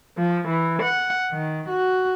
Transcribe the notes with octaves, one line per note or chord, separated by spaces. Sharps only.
F3
E3
F#5
D#3
F#4